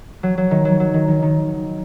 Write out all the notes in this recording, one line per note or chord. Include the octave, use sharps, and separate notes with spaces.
F#3
F#3
D#3
F#3
F#3
D#3
D#3
D#3